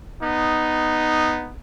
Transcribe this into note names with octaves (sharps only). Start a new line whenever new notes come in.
B3 D#4